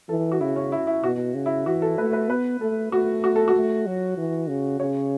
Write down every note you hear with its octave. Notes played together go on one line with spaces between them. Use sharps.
E3 A4
F#4
C#3 E4
C#4
E4
E4
B2 F#4
C#3
E4
E3 F#4
A4
A3 B4
B4
B3 B4
A3 A4
A3 F#4
F#4
A4
F#4
A3
F#3
E3
C#3
C#3 C#5